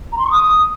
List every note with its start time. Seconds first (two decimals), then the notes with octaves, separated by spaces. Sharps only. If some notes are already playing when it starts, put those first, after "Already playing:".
0.11 A#5
0.17 C6
0.24 C#6
0.30 D#6